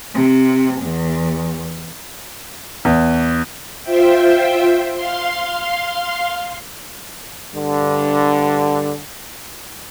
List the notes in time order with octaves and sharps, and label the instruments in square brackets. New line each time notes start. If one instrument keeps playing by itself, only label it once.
[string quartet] C3
E2
[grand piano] E2
[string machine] F4 C5 E5 G5
F5 C6
[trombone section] G2 D3